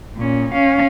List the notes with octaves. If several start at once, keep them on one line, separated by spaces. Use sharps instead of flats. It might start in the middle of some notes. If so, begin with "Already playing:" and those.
A#2 C#4
C#4 F5